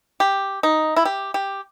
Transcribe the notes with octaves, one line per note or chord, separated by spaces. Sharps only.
G4
D#4
E4
G4
G4